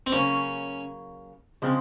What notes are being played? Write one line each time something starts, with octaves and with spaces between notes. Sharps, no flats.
C4
C#3 F#3 A#3 C#4
C#3 F3 G#3 C4